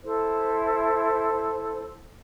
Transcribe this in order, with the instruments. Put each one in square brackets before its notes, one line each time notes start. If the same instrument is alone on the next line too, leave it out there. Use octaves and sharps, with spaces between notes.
[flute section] E4 A4 C5